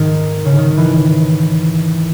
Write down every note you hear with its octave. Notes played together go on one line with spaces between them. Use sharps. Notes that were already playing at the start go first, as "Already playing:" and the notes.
Already playing: G#2 D#3
C#3
D#3
E3